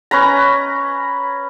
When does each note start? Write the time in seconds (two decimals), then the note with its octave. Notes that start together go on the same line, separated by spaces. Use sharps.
0.11 C#4 B4 A#5